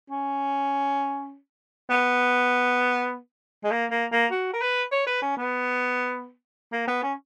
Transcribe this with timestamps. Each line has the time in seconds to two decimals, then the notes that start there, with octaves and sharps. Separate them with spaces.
0.10 C#4
1.90 B3
3.64 G#3
3.71 A#3
3.91 A#3
4.12 A#3
4.31 F#4
4.53 A#4
4.62 B4
4.92 C#5
5.07 B4
5.22 C#4
5.37 B3
6.72 A#3
6.87 B3
7.03 C#4